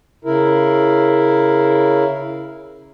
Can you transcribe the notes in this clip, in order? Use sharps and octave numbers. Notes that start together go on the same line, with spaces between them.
C#3 E4 A#4